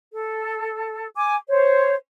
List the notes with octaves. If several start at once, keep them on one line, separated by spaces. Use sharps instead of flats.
A4
G#5 D6
C5 C#5